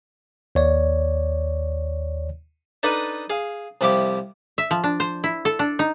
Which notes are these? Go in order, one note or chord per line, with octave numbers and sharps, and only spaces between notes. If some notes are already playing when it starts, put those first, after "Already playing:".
D#2 C#5 D5
D4 D#4 A4 B4 D#5
G#4 F5
C2 F3 E4 G4 D6
E5
F3
D4
C5
E4
A4
D4
D#4